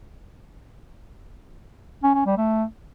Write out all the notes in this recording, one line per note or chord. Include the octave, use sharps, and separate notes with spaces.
C#4
C#4
G3
A3